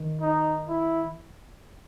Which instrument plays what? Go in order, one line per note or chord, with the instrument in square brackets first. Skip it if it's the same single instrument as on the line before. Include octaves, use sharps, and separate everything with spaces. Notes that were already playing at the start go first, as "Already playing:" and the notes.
Already playing: [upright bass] D#3
[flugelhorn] D#4
E4